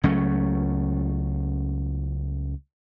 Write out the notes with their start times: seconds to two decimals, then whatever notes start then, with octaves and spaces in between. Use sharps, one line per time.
0.03 C#2 F#3 A3 C#4